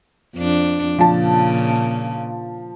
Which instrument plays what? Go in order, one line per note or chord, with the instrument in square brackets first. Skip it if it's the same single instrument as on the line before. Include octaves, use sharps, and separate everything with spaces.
[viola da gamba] F2 D4
[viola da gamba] A#2 C#3 [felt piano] F3 A5